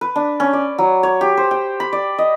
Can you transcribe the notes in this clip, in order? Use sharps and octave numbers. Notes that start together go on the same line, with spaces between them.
B4
D4
C#4
D5
F#3
C#5
G4
C5
G5
B5
D5
D#5